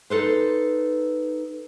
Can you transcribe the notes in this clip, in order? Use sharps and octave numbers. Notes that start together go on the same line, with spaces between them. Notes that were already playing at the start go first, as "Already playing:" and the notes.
D#4 A4 B4 C5